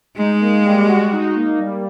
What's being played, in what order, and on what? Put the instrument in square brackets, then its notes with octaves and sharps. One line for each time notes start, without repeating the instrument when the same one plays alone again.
[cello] G#3 [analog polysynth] D#4
[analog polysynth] A#3
G3
F#4
D#4
A#3
G3